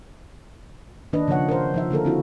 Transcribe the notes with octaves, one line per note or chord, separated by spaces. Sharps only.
D#3 A#3 D4 B4 D#5
C#3 F3 A#3 C#5 F#5
A#4 C5
F3 D#4 E5
D3 A#3 A4 A#4
C4 E4 F#4